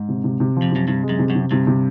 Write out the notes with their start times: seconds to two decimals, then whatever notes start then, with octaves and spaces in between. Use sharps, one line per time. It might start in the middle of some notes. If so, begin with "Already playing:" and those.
Already playing: G#2
0.09 C3
0.24 C3
0.40 C3
0.56 F3
0.62 F2
0.71 F#2 C3
0.88 G2 C3
1.03 G#3
1.09 F#2
1.19 C3
1.30 F#2
1.35 C3
1.51 G2 C3
1.67 C3